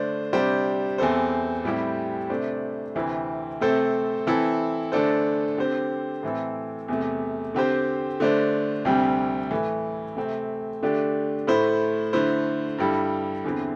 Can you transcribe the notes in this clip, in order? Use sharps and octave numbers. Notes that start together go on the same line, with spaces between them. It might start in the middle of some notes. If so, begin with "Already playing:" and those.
Already playing: D3 A3 D4 C5
C3 G3 D4 G4 C5
E2 E3 C4 A4 C5
A2 G3 C4 E4 G4
C3 A3 D4 C5
D2 C3 E3 C4 E4
C3 A3 C4 A4 C5
E3 C4 E4 A4
D3 A3 D4 A4 C5
D3 C4 G4 C5
A2 E3 C4 A4
E2 C3 A3
D3 C4 G4 C5
D3 A3 D4 C5
D2 C3 G3 C4
A2 E3 A3
C3 A3 C4
D3 A3 D4 G4
A2 A3 E4 C5
D3 A3 E4 C5
G2 G3 E4 A4
E2 D3 C4 E4